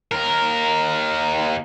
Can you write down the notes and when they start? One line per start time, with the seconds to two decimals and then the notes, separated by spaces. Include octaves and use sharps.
0.12 D#2 A#4